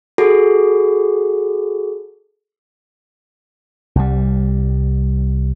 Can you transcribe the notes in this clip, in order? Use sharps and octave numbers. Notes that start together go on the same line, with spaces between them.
F#4 G#4 A4
C2 G3